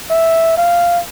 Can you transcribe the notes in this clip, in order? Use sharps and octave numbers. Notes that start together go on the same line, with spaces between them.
E5
F5